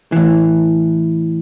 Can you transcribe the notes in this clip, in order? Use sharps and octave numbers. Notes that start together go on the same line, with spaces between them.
A2 E3